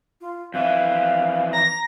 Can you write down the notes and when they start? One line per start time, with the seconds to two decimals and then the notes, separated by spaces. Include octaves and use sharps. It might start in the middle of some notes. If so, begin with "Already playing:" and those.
0.21 F4
0.54 F2 E3 F5
1.53 A#5 A#6